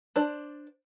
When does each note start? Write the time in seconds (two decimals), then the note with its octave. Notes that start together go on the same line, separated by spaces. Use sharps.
0.16 D4 C5 D5